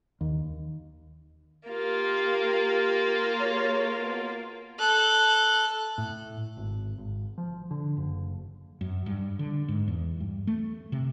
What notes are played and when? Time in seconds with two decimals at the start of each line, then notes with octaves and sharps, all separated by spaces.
0.21 D#2
1.69 A#3 F4 G4
3.40 F#4 G#4 C#5
4.00 B2
4.79 A4 F#6
5.98 A2
6.57 G#1
6.98 G#1
7.38 F3
7.71 D3
7.97 F#1
8.81 F#2
9.06 G2
9.39 D3
9.68 G#2
9.88 E2
10.20 G2
10.47 A3
10.92 C3